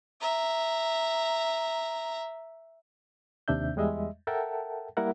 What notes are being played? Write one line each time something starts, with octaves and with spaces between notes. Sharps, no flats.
E5 A#5
D#2 C3 D4 E5 G6
E2 G3 G#3 D#5 E5
A4 A#4 E5 F#5 G5 A5
G3 A#3 E4 A#4 E5 F#5